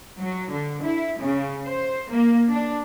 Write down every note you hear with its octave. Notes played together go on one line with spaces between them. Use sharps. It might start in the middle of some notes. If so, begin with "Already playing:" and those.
F#3
D3
E4
C#3
C5
A#3
D4